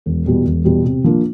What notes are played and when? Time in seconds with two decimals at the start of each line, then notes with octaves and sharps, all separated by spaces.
0.06 E1
0.26 E2 B2 G3 B3
0.45 E1
0.64 E2 B2 G3 B3
0.85 C3
1.04 F3 A#3 D4